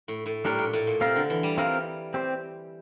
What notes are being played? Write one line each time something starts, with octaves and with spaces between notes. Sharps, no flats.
A2
A2
A2 G3 D4 G4 A#4
A#2
A2
A#2
C3 C4 F4 A#4 F5
D3
E3
G3
G3 C4 F4 A#4 F5
C4 G4 C5